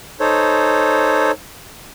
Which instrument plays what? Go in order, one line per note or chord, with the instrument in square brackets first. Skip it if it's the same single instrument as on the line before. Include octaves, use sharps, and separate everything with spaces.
[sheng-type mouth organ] D#4 A4 C5 C#5